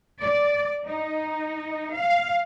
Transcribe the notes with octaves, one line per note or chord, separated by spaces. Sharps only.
D5
D#4
F5